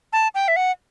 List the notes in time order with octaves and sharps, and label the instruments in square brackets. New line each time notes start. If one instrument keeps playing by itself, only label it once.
[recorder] A5
G5
E5
F#5